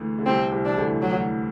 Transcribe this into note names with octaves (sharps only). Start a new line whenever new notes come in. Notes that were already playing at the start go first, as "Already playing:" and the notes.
Already playing: D2 D3 E3
D3
C2 C3 C4
C2 C3
E3 D4
D2 D3
F#3